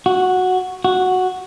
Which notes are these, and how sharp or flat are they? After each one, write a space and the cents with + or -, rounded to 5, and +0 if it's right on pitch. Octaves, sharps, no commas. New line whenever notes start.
F#4 -5
F#4 -5